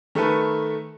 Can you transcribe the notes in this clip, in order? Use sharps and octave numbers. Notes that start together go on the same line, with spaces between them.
D#3 A3 A4 B4